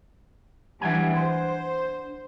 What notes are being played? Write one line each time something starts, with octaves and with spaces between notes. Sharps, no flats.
E3 G3 D4 F#5 G#5
C5